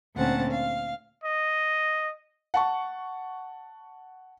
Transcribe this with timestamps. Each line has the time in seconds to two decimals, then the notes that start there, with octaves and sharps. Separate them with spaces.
0.14 D2 A#2 C4 C#4 F#5 A5
0.50 F5
1.24 D#5
2.54 F#5 A5 C#6